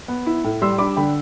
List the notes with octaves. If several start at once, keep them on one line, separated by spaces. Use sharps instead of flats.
B3
E4
A2
G3 C6 E6
D4 B5 D6
D3 G5 B5